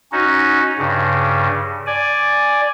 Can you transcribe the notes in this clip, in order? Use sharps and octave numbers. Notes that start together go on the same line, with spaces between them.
C#4 D#4 F#4
G2 C#3
D5 G#5